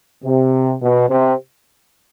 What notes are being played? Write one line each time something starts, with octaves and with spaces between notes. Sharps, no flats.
C3
B2
C3